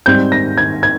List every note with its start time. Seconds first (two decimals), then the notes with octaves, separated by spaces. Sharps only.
0.06 G#2 G3 C4 G6
0.32 A#6
0.57 G#6
0.83 G#6